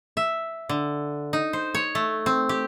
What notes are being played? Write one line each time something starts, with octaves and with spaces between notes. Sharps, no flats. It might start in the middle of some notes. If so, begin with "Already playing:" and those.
E5
D3
D#4
C5
C#5
A3
C4
G4